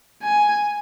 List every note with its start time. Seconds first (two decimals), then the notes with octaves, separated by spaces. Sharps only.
0.23 G#5